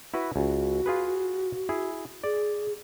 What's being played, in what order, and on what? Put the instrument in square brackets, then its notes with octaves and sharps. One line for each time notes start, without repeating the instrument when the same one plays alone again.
[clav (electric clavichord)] E4 F#4 B4
[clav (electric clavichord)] C#2 [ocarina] F#4
[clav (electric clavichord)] F4 G#4 B4
E4 G#4
[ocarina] G#4 [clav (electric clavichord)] D5